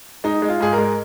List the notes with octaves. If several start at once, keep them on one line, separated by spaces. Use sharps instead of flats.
G#3 D#4
G#3
F4
G#2 G#4
A#4
G#3